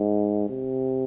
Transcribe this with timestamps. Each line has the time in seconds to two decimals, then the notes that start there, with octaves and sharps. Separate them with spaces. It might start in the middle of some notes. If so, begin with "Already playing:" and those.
Already playing: G#2
0.49 C3